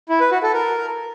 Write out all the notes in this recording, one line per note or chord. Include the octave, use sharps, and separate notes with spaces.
E4
B4
F#4
A4
A#4